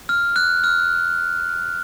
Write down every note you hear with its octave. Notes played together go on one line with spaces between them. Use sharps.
F6
F#6
F6